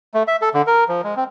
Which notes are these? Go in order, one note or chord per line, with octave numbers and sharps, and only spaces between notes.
A3
E5
A4
D3
A#4
F3
G#3
C4